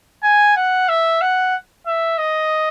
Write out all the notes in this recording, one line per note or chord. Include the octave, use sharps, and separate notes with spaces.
G#5
F#5
E5
F#5
E5
D#5